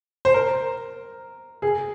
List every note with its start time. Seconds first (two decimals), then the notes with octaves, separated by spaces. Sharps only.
0.25 C5
0.34 A#4
1.62 G#4